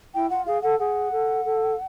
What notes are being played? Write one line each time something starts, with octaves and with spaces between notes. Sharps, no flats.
E4 G5
F4 F#5
G#4 F5
A4 F#5
G#4 F#5
A4
A4